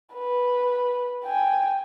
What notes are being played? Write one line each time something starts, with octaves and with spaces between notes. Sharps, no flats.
B4
G5 G#5